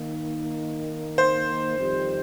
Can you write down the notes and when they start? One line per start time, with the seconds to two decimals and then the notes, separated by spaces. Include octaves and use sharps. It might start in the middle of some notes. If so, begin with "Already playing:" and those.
Already playing: D#3 A#3 D#4
1.18 C5
1.77 F2 D#3 G3 C4 G4